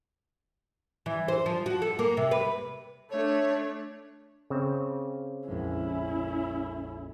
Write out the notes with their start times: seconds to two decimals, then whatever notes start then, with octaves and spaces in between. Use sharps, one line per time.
1.06 E3
1.28 C5
1.46 F3
1.66 F#4
1.82 A4
1.99 A#3
2.17 C3
2.31 B4
3.11 A3 D4 C#5
4.50 C#3 C4 C#6 D6 E6
5.48 A#1 F2 G#3 C#4 E4